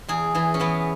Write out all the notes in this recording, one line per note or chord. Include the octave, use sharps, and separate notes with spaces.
E2 G#4
E3 G#4
C#4
E3 B3